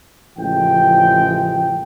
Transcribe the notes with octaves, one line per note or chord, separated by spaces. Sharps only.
A1 C#3 F3 G#3 G5